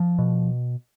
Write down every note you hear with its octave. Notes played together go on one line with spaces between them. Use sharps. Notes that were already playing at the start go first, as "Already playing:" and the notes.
Already playing: F3
B2